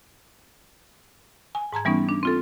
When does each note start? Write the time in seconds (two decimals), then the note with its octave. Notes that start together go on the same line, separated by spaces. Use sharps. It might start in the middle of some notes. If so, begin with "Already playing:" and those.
1.55 G#5
1.72 G#2 A5 A#5 G#6
1.85 E3 G3 B3 C#4 D#4
2.09 D4
2.23 C4 F4 A4